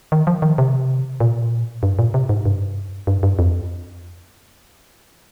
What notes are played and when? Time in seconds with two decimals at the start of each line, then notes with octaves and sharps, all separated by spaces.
0.12 D#3
0.27 F3
0.42 D#3
0.58 C3
1.20 A#2
1.83 G2
1.99 A#2
2.14 C3
2.29 G#2
2.45 G2
3.07 G2
3.23 G2
3.39 F2